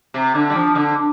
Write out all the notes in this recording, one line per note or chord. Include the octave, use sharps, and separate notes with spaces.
C3
D3
G3
F3
D3